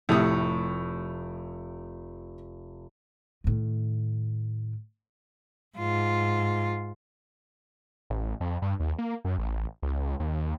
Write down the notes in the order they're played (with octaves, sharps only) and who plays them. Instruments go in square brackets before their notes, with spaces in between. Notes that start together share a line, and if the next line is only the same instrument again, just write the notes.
[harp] F1 B5 C#6 [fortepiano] A2 C3 D#6
[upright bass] A2 D#3
[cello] G#2 F4
[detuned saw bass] A1
F2
G2
D#2
A#3
F#2
A1
C#2
D#2